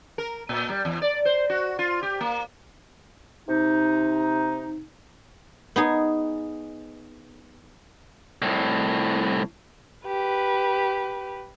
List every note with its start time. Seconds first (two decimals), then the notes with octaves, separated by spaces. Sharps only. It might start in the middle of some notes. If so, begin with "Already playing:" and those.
0.18 A#4
0.49 A#2
0.69 G3
0.85 E2
1.02 D5
1.25 C5
1.50 F#4
1.79 F4
2.03 G4
2.21 A#3
3.49 C3 D#4
5.76 B3 D#4 G#4
8.42 C2 A2
10.07 G4 B4